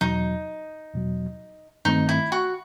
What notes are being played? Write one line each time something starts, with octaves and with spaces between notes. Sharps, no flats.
E2 B2 F#3 D#4
E2 B2 F#3
G2 D#3 A3 C4 D#4
E4
F#4